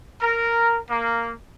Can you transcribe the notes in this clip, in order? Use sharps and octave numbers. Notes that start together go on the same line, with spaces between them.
A#4
A#3